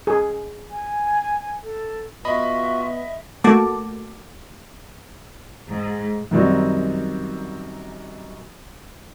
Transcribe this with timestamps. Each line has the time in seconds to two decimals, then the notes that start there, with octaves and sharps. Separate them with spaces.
0.07 G#4
0.70 G#5
1.62 A4
2.25 B3 F4 F#4 D#5 E5 B5
3.44 A3 A#3 F#4 A5 D6
5.68 G#2
6.31 F#2 D#3 G3 C4 D#4 F#4